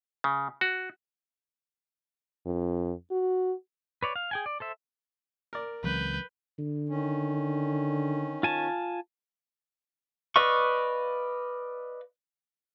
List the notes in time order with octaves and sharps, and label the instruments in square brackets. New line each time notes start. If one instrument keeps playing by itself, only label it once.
[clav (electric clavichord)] C#3
F#4
[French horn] F2
F#4
[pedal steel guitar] B4 C#5 D5
F5
G#4 G5 G#5
D5
A4 C5 E5
[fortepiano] A#4 D5
[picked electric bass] C#2 [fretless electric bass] E3 F#3 C4 [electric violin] B4 G6
[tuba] D3
[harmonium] D#3 C#4
[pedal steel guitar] F4 G#5 A5
B4 D5 D#5 F5 C#6